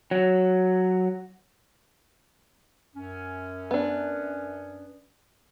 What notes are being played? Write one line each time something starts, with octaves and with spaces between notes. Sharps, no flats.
F#3
F#2 C#4
B3 D4